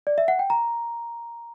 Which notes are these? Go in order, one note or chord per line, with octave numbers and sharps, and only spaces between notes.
D5
E5
F#5
G5
A#5